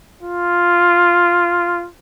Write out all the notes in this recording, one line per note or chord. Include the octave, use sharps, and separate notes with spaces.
F4